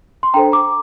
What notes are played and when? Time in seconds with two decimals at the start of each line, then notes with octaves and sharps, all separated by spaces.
0.23 C6
0.34 D4 A4 C5 G5 A#5
0.52 A#5 D6